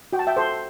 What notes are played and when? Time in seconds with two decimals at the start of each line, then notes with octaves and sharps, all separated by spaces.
0.13 F#4 G5
0.19 A5
0.27 E5 G5
0.37 A4 C5